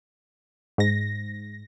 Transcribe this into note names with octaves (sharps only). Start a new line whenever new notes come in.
G#2 A#6